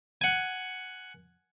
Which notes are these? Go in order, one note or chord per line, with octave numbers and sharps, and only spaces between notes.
F#5 G#5